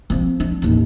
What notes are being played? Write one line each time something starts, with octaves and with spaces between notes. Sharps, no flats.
F3 C4
D4
A1 D#2